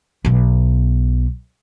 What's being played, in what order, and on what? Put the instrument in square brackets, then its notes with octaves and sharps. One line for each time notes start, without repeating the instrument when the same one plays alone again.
[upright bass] B1 B3